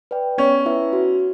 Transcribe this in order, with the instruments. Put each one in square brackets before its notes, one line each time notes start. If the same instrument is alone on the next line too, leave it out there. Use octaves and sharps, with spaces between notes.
[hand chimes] B4 D5 G5
[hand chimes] B3 [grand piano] C#4
[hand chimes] E4 B4 E5
F#4